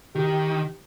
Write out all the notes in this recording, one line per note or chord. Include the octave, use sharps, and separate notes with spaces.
D#3 G4